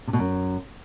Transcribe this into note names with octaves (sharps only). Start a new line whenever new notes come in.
C3
B2
F#2